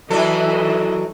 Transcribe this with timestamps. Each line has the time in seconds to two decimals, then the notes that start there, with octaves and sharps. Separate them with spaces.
0.10 D#3 E3 F#3 D4 A4 D#5